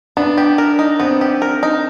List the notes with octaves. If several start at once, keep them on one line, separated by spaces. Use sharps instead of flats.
B3 D4
G4
A#4
D#4
B3 C4
G4
A#4
D#4